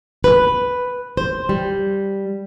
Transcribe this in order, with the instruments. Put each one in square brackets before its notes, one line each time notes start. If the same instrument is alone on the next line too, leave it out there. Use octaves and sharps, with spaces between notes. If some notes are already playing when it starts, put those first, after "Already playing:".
[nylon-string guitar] B4
C5
G3